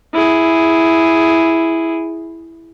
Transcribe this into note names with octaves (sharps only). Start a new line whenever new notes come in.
E4 G#4